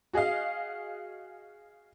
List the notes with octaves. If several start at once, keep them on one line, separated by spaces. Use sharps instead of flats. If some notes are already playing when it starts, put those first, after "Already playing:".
F#4 G#4 D#5 F5